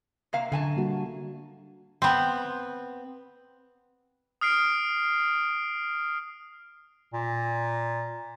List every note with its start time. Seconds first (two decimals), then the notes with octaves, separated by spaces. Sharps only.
0.33 C3 A#3 F5
0.52 F#2 D3 G#5 A5
0.76 G3 A#3 F#4
2.02 B3 C4
4.41 D#6 F6 C7 D7
7.13 A#2